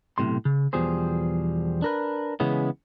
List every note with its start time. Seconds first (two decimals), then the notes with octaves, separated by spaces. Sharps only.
0.18 B1 E2 A2 C3 C6
0.45 C#3
0.73 E2 B2 F3 G3 G#4 C5
1.82 D4 A#4 B4
2.40 C#3 E3 G#3 B3 C#4